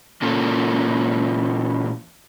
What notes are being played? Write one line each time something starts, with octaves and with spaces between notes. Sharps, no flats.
A#2 E3 A#3 C#4 F4 A4